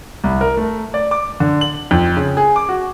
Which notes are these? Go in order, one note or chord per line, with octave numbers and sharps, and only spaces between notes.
C2
A#4
A3
D5
D6
D3
F#7
F2
C#3
G#4
D6
F#4